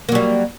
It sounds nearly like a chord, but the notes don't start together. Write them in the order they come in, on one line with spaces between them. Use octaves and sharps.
A#3 F#3 G3